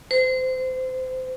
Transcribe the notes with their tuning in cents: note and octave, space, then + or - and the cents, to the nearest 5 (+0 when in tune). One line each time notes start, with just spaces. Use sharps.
C5 -25